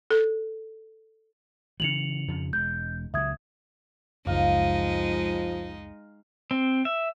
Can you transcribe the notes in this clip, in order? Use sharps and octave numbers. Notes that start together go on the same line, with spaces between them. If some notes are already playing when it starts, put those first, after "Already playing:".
A4
C#3 E3 F#3 C#7 F7 F#7
F2 C#3 F3
E1 G#3 G6
C#2 F#3 E5 D#6 G#6
F#1 C#2 F3 G#3 D#4 F5
C4
E5